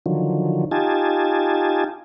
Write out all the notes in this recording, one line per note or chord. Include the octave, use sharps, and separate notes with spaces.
D3 D#3 F3 F#3
D#4 F4 G4 G#5 A5